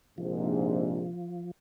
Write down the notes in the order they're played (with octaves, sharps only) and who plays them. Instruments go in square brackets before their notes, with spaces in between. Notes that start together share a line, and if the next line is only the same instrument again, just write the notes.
[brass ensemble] A#1 G#2 C3 [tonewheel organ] F3